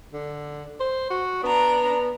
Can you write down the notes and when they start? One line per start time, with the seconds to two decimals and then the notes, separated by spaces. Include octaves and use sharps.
0.13 D3
0.80 C5
1.10 F#4
1.43 B3 D4 A#5